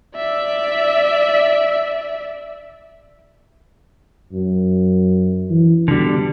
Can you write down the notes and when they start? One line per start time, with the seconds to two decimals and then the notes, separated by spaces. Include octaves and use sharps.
0.16 D5 E5
4.32 F#2
5.50 E3
5.88 B2 D3 G3